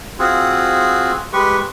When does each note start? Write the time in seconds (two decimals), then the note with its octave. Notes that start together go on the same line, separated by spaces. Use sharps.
0.19 C4 F4 F#4 G#4
1.33 G#3 G4 B4 C#6